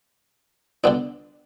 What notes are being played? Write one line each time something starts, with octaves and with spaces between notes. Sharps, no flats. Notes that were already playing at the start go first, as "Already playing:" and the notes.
D3 B3 D4